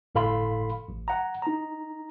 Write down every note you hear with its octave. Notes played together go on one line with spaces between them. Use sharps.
G1 A2 A4 F5 B5 C6
A1
F#5 A#5
D#4 A#5